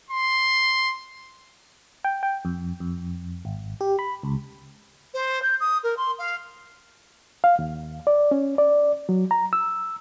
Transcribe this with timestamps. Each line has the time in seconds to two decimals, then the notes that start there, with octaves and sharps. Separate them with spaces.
0.11 C6
2.04 G5
2.23 G5
2.45 F2
2.80 F2
3.45 G#1
3.81 G4
3.99 B5
4.23 C#2
5.14 C5
5.42 G6
5.60 D#6
5.83 A#4
5.97 C6
6.18 F5
7.44 F5
7.59 D#2
8.07 D5
8.31 C#4
8.58 D5
9.09 F#3
9.31 A#5
9.53 E6